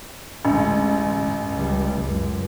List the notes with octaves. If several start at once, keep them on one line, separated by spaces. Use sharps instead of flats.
A1 D2 G#3
G1
C#2 G3
C#2 F#2